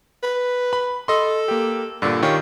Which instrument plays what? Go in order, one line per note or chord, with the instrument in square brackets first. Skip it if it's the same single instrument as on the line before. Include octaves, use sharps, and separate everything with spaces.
[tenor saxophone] B4
[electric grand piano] B5
[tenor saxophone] A4 [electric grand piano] D#5 C6
[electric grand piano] A#3 G4
[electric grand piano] G2 A#2 [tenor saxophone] D3
[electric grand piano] D#3 F4 G4 [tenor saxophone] C#5